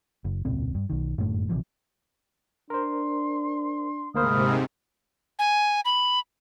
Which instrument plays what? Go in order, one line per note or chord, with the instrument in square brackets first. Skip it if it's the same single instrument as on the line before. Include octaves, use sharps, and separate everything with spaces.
[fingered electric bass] F#1
E1 C#2 A#2 C4
G2
B1 D#3
G1 F#2 A2 A3
A#1 C3 E3 F3
[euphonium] D4 [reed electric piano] A#4 C5 [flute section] C6
[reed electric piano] D2 A#3 C5 [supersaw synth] G#2 C3 [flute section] B5 D#6 F6
[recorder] G#5
B5